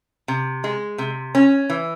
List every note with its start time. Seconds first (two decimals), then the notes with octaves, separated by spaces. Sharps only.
0.28 C3
0.64 G#3
0.98 C3
1.35 C#4
1.70 E3